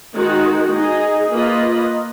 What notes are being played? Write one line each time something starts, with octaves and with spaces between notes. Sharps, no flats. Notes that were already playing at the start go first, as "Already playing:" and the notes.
D#3 G#3 D#4 F#4
D#4 G#4 D#5
A#3 F4 B4 D#5